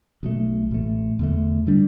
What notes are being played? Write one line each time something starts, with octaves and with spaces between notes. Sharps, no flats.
B1 B2 A3
A1 A2 A3
E2 D3 A3
D3 G3 D4